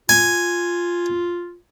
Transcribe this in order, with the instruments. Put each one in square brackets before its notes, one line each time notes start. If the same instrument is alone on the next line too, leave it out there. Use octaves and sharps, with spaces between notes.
[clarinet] F4 [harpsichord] G#5